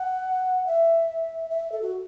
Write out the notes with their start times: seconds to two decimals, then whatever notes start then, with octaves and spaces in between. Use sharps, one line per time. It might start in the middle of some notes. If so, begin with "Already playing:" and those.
Already playing: F#5
0.67 E5
1.50 E5
1.72 A4
1.82 F#4